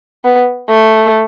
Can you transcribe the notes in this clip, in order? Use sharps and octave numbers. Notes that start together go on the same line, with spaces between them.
B3
A3